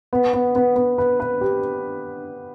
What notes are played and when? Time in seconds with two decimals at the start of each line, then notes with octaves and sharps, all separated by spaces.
0.13 B3
0.33 B3
0.55 B3
0.76 B3
0.98 B4
1.20 B4
1.41 G4